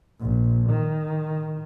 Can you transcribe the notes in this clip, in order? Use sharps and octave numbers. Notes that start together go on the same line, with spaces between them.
A#1
D#3